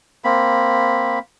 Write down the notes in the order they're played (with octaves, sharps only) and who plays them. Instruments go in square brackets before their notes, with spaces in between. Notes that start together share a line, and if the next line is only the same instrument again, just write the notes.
[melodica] A#3 C4 B5